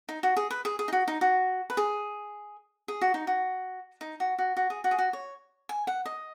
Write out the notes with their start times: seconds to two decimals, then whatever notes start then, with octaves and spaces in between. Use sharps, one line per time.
0.09 D#4
0.23 F#4
0.37 G#4
0.51 B4
0.65 G#4
0.79 G#4
0.88 D#4
0.93 F#4
1.08 D#4
1.21 F#4
1.70 B4
1.77 G#4
2.88 G#4
3.01 F#4
3.14 D#4
3.27 F#4
4.01 D#4
4.20 F#4
4.39 F#4
4.57 F#4
4.70 G#4
4.84 F#4
4.91 G#4
4.98 F#4
5.13 C#5
5.69 G#5
5.87 F#5
6.06 D#5